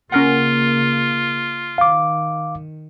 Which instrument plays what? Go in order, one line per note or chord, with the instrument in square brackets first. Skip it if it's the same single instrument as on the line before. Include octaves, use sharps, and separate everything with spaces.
[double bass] C#3 A#3 [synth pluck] C#4 A#4 F#5 [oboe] F4
[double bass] D#3 [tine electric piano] F5 D6